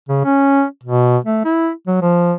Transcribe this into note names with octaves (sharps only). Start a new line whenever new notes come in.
C#3
C#4
B2
A3
E4
F#3
F3